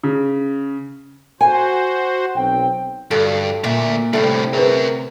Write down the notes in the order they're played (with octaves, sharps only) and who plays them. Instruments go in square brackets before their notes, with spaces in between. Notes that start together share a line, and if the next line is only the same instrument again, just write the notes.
[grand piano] C#3
[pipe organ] F#4 C5 [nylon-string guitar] G#5
[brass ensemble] B1 C4 G5
[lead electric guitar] G2 [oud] D3 [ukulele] F#4 A4
[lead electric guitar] D2 E5 [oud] A#2
[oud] D2 C3 [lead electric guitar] A2 G3 [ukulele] D4 E4 A4 [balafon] E5
[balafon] G#4 B4 [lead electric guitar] A#4 E5